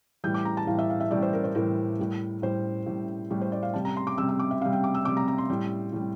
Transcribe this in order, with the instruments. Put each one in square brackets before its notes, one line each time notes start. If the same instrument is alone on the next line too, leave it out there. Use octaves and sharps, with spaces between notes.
[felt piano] A2 E3 G3 G6
D6
A#5
A5
A2 E3 G3 F5
E5
F5
E5
A2 E3 G3 D5
C5
A#4
C5
A2 E3 G3 A#4
A2 G3
A2 G3 C5
A2 G3
A2 G3
C5
D5
F5
C3 G3 A5
A#5
C6
D6
C3 G3 E6
E6
D6
E5
C3 F5
G3
G5
D6
E6
C3 D6
G3
A#5
A#5
C6
A2 G3
A2 G3